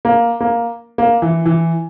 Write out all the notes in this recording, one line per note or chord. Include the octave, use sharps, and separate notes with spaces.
A#3
A#3
A#3
E3
E3